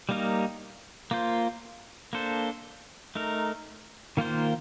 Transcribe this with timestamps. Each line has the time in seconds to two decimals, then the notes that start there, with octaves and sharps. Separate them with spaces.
0.09 G3 A#3 D#4 A#4
1.11 A#3 F4 C5
2.13 A#3 D4 A4 C5
3.15 A3 D#4 A#4
4.17 D#3 A#3 F4 C5